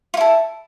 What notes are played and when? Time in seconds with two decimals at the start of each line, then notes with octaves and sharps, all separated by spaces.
0.14 F4
0.17 E4
0.21 A4